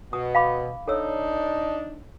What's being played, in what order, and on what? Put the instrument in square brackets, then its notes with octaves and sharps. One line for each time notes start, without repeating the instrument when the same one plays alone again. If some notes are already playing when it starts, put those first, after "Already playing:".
[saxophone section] B2 [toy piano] D#6
[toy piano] F5 B5 D6
[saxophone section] D4 D#4 [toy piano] A4 C#5 E6